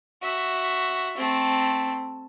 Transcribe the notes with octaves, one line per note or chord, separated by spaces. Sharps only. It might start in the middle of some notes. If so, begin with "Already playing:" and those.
F#4 E5
A3 C4